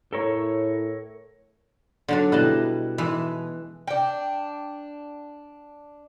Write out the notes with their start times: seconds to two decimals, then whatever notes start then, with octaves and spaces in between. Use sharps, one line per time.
0.13 A2 A4 A#4 C#5
2.08 D3 F#3 D4
2.32 B2 G3 E4 D#5 A5 F#6
2.98 E3 G#3
3.87 D4 G5